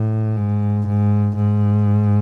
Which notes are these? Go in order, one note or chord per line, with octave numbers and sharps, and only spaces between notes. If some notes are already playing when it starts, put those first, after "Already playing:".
Already playing: A2
G#2
G#2
G#2